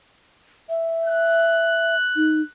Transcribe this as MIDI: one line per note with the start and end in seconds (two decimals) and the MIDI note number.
0.69 1.95 76
1.06 2.51 90
2.16 2.41 63